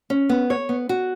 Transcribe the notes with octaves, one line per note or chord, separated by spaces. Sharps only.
C#4
B3
C#5
B3
F#4